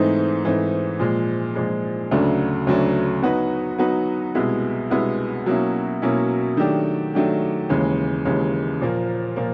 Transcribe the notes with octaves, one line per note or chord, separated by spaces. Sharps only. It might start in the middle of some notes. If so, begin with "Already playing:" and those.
Already playing: G#2 E3 A3 C4 D#4
G#2 E3 A3 C4 D#4
A#2 F3 G#3
A#2 F3 G#3
D2 C#3 F#3 A3 D4
D2 C#3 F#3 A3 D4
F#3 B3 D#4 F#4 B4
F#3 B3 D#4 F#4 B4
C2 B2 G#3 B3 E4
C2 B2 G#3 B3 E4
B2 F#3 A#3 C#4 E4
B2 F#3 A#3 C#4 E4
D#3 F#3 A3 D4 G4
D#3 F#3 A3 D4 G4
D#2 C#3 E3 G#3
D#2 C#3 E3 G#3
A#2 F3 A#3
A#2 F3 A#3